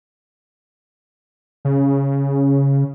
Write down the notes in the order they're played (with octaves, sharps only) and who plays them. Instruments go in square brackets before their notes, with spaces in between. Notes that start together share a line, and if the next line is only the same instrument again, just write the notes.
[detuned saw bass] C#3